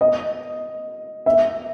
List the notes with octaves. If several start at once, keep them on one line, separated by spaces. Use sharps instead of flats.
D#5
E5